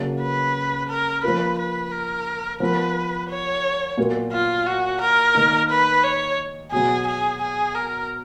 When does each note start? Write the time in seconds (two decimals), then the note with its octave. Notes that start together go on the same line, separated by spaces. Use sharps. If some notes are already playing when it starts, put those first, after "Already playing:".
Already playing: C#3 F#3 A#3
0.21 B4
0.89 A#4
1.23 F3 A#3 F4 A#4 B4
1.58 B4
1.92 A#4
2.60 F3 B3 F4 A#4 B4
3.30 C#5
3.97 A#2 F#3 B3 F#4 A#4
4.32 F4
4.66 F#4
5.01 A#4
5.35 D#3 A#3 D#4
5.70 B4
6.03 C#5
6.72 B2 F#3 B3 G#4
7.07 G#4
7.41 G#4
7.75 A#4